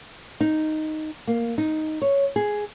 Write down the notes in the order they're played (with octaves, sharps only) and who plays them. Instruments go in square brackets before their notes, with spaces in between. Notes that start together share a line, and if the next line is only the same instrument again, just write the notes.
[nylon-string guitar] D#4
A#3
D#4
C#5
G#4